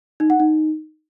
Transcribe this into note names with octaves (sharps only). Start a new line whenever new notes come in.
D#4
F#5
D#4